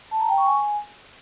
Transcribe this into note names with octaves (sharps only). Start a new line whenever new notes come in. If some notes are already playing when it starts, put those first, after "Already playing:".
A5
A#5
G5
C#6
G#5